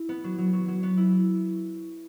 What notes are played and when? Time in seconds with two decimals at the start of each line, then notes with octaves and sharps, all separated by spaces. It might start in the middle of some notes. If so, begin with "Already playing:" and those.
Already playing: E4
0.09 B3
0.24 F#3
0.38 F#3
0.53 F#3
0.68 F#3
0.83 B3
0.97 E4